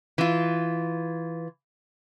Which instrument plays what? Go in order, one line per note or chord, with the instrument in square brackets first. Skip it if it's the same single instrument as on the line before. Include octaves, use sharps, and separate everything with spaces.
[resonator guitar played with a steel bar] E3 F4